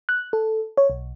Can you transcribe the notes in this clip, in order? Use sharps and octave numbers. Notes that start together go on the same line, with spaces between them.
F#6
A4
C#5
B1